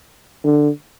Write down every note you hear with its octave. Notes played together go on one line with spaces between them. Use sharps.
D3